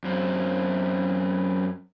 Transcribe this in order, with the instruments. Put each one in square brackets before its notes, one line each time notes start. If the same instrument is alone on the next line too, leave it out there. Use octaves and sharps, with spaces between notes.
[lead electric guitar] F#2 C4